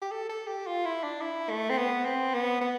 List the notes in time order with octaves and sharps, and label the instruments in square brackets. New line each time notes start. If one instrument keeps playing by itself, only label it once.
[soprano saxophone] G4
A4
A4
G4
F4
E4
D4
E4
A3
C4
B3
C4
B3
B3